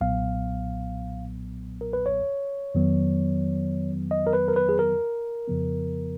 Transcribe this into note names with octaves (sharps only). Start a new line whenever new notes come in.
B1 A#2 F#3 B3 F5
A#4
B4
C#5
F2 D#3 F#3 B3
D#5
A#4
B4
A#4
B4
G#4
A#4
F2 C#3 F3 B3